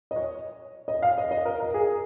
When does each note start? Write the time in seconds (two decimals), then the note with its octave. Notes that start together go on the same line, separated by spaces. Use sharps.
0.11 D#5
0.16 C#5
0.88 D#5
1.02 F5
1.18 D#5
1.31 D#5
1.45 A#4
1.60 A#4
1.74 G#4